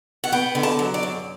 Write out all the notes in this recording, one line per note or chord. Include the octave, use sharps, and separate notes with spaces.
F#5
B3 G5
D3
A5
F#3
D5
F#2